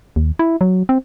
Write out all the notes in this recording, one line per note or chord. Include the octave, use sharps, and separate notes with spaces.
D#2
E4
F#3
C4